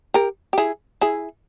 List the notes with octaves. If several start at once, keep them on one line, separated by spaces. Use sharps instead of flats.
G4 A#4
G4
E4 G#4
E4 G#4